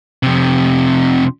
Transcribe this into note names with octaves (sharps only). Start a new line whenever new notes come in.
F2 C3